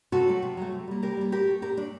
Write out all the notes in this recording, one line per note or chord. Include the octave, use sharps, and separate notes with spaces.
C3 F#4 A4
F#3 A3
C3
F#3 A3
C3
G3 A#3
C3 G4 A#4
G3 A#3
A#2 G4 A#4
A3
A#2 G4 A#4
A3 D4